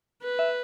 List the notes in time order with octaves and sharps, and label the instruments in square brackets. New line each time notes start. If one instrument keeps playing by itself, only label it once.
[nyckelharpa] B4
[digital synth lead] E5